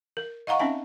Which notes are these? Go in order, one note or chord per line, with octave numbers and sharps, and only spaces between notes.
A#4
D#5 F5 F#5 A#5 C#6
C4 C#4 D#4 E5 G#5